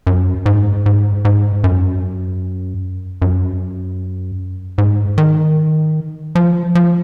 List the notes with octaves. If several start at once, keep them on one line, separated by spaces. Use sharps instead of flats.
F#2
G#2
G#2
G#2
F#2
F#2
G#2
D#3
F3
F3